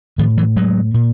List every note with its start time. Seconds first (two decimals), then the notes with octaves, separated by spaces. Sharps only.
0.18 A2 D#3 F3
0.38 E3 F#3
0.57 F#3 G#3
0.94 A#2